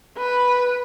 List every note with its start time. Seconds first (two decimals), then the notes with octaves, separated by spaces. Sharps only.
0.18 B4